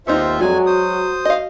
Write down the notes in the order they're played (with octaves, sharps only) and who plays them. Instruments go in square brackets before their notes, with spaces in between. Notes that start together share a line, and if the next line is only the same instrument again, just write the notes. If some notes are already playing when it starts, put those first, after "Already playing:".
[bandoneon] D#2 F4 E5 [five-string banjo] B3 C4 D#4 [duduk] C5
[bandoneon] F2 G#5 [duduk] F#3 [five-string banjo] G#3 D4 [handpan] F#4
[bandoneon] C5 D#6
[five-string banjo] D#5 F5